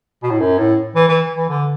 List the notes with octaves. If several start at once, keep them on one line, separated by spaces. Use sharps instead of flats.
B2
A2
F#2
A2
E3
E3
E3
D3